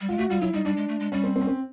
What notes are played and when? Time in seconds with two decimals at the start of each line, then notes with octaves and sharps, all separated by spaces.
0.01 G3
0.09 G#3 F4
0.18 A3 F#4
0.30 G3 F4
0.41 F#3 E4
0.53 G3 D#4
0.65 G3 D4
0.77 G#3
0.88 A3
1.00 G#3
1.12 G3 C#4
1.24 C4
1.36 C4
1.41 C#4
1.47 C4